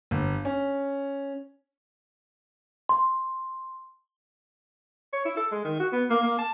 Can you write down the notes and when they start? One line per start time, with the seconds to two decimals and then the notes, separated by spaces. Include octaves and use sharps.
0.11 G1
0.45 C#4
2.89 C6
5.13 C#5
5.25 E4
5.37 A4
5.52 G#3
5.64 D#3
5.79 F#4
5.92 B3
6.10 A#3
6.23 A#3
6.38 A5